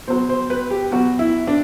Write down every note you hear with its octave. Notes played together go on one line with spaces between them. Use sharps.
B2 F#3 C5
C5
B4
G4
B2 F#3 F#4
E4
D4